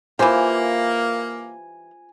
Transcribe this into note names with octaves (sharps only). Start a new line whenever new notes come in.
E3 A#3 F4 G4 C5 G#5